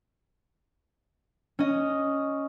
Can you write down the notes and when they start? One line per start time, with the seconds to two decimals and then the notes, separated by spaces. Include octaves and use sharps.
1.59 C#4 D#5